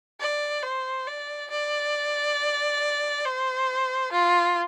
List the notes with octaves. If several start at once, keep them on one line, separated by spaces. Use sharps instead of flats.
D5
C5
D5
D5
C5
F4